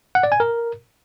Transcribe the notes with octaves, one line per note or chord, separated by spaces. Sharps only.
F#5
D5
G#5
A#4